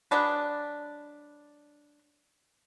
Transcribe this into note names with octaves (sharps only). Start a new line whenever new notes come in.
F#3 G#3 D4 B4